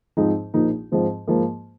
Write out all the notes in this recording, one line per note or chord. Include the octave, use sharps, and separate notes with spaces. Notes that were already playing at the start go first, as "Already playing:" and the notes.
G#2 F3 C4 D#4
A#1 A#2 F3 A#3 D#4
G#2 F3 C4
G#2 F3 A#3